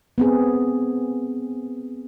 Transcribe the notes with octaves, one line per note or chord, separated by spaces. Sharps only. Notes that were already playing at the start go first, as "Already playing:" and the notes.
B3 C4 G#4